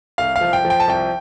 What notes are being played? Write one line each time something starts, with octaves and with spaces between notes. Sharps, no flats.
C2 F5
F5
F3
G5
F3
G5
A5
C2 G5